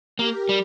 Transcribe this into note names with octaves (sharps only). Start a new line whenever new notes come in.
A#3 G4 A#4
G3